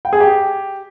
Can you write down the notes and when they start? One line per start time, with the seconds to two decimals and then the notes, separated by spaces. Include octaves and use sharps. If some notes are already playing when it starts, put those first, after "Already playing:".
0.05 G5
0.13 G#4
0.20 G4